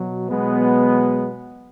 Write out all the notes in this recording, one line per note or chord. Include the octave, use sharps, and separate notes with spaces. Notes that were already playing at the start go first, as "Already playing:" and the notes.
Already playing: B2 F#3
B2 F#3 G#3 B3